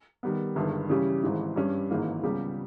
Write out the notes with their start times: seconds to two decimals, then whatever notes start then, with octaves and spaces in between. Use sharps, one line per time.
0.23 D#3 G3 B3
0.56 G1 G2 D#3 G#3
0.89 C#3 E3 G3 C#4 G4
1.23 G#1 G#2 E3
1.56 G2 G3 C#4
1.90 G#1 G#2 E3 A#3
2.23 C#2 C#3 G3 B3 G4